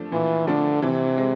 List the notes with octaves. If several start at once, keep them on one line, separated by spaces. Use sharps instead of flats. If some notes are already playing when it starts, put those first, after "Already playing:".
Already playing: F3 A3 D4
A#2 E3
D3 F3 A3 D4
C3 E3
G#3 C4